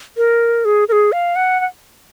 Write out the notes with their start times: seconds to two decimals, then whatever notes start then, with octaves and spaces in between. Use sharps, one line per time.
0.17 A#4
0.65 G#4
0.88 A#4
0.92 G#4
1.12 F5
1.36 F#5
1.60 F#5